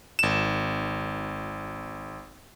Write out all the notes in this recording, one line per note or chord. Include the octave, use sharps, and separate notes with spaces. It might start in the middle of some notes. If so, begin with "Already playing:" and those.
G#1 E7